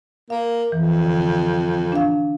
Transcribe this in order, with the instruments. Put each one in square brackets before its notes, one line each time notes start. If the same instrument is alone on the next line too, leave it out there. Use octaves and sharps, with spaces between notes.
[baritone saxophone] A#3 [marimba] F5
[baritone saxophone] F2 [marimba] E3
[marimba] D3
D4 F5